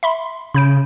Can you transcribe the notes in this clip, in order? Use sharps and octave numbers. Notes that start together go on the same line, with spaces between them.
E5 B5 C6
C#3 B5 G6 D7